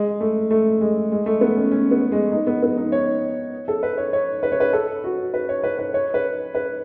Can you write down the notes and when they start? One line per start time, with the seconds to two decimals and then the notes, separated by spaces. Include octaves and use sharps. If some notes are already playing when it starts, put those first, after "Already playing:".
Already playing: G#3
0.21 A3
0.51 A3
0.81 G#3
1.12 G#3
1.26 A3
1.41 B3
1.56 C#4
1.71 C#4
1.91 B3
2.12 G#3
2.32 D#4
2.47 B3
2.62 B3
2.77 D#4
2.92 C#5
3.68 A4
3.83 B4
3.98 C#5
4.13 C#5
4.43 B4
4.52 C#5
4.60 B4
4.73 A4
5.04 F#4
5.34 B4
5.49 C#5
5.64 B4
5.79 B4
5.94 C#5
6.14 B4
6.55 B4